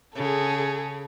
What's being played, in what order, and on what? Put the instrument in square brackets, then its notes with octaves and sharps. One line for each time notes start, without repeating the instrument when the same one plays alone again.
[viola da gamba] C#3 [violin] G#4 A4